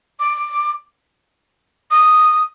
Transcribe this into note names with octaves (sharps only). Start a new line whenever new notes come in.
D6
D#6